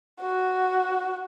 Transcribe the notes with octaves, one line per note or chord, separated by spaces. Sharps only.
F#4